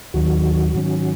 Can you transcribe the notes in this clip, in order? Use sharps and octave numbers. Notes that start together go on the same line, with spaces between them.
D#2 D#3 F#3 F#4
G#2 D#3 F#3 C#4